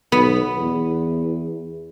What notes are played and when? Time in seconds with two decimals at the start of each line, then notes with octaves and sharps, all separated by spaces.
0.12 B1 B3
0.57 E2